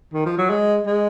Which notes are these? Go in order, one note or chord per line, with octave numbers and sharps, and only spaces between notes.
D#3
F3
F#3
G#3
G#3